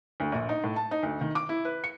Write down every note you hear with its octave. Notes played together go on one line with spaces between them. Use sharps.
D2
A#1
D#4
A2
A5
D#4
D2
D#3
D6
E4
B4
C#7